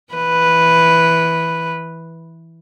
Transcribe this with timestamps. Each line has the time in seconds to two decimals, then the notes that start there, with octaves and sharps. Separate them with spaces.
0.13 E3 B4